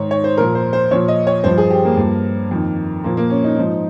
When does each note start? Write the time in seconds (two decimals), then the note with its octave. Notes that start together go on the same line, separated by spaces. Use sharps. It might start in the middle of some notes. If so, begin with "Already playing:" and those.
Already playing: G#2 D#3 C#5
0.11 C#5
0.24 C5
0.38 A#2 F3 A#4
0.55 C5
0.73 C5
0.91 A#2 F3 C#5
1.08 D#5
1.27 C#5
1.44 G2 F3 C5
1.58 G#4
1.71 G4
1.85 A#3
1.97 G2 F3
2.51 F2 D#3
3.04 A#2 F3 A#3
3.17 A#3
3.30 C#4
3.44 D#4
3.57 G#2 F3